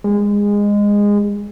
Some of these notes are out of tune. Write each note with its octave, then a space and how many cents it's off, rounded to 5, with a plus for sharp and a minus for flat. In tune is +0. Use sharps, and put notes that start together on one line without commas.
G#3 -20